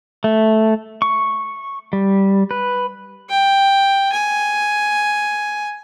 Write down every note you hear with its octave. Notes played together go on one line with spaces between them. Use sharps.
A3
C#6
G3
B4
G5
G#5